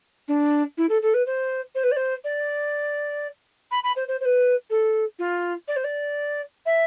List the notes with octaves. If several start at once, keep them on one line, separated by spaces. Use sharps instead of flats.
D4
E4
A4
A4
B4
C5
C5
B4
D5
C5
D5
B5
B5
C5
C5
C5
B4
A4
F4
D5
C5
D5
E5